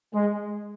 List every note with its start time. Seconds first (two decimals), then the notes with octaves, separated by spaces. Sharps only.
0.14 G#3